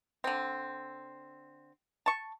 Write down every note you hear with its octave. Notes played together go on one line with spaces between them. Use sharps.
D3 C4
A5 C#6